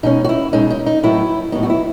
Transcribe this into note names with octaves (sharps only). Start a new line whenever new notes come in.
B2 G#3 C#4 D#4
F#4
E4
B2 G#3 C#4 D#4
D#4
D#4
A2 F#3 B3 E4
A2 F#3 B3 D#4
F#4
E4